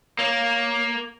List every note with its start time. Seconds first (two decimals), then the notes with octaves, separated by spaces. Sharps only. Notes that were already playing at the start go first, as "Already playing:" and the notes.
0.19 A#3 C#5